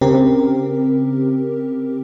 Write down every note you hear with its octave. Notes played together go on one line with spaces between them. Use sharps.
C#3 C4 G4 A#4